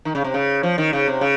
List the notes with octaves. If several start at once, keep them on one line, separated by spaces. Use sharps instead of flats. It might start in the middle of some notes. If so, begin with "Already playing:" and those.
D#3
C#3
C3
C#3
F3
D#3
C#3
C3
C#3